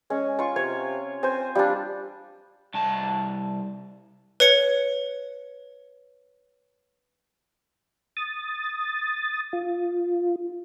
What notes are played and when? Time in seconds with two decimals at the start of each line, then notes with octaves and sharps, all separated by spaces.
0.10 G#3 C#4
0.39 F4 C#6
0.56 C3 C#5
1.23 C4 C5 G#5
1.55 G3 D4 F4
2.75 C2 A5
4.40 B4 C#5 C#7
8.17 D#6 A6
9.53 F4